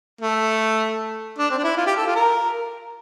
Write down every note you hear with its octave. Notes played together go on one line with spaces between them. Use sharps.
A3
D4
C4
D4
E4
F4
G4
A4
F4
A#4